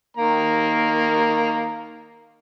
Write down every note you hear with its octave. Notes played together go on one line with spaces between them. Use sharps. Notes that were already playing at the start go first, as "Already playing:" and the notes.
D#3 A#3 A#5